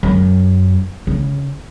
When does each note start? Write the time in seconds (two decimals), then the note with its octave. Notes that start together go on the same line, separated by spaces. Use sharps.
0.03 F#2
1.07 C#3